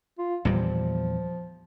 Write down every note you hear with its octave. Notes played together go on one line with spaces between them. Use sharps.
F4
E2 A#2 F3 G3